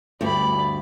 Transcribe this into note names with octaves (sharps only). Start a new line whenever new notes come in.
D2 G2 D5 B5